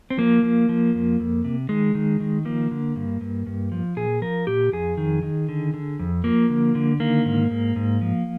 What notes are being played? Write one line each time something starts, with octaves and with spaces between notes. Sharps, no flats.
C4
F3 A#3
F3
F3
F2
F2
C3
D#3 G#3
D#3
D#3
F3 A#3
D3
G2
G2
G2
F3
A#2 G#4
F3 A#4
A#2 G4
F2 G#4
D#3
D#3
D3
D3
F2
F3 A#3
D3
D3
D#3 A#3
G#2
G#2
G#2
F3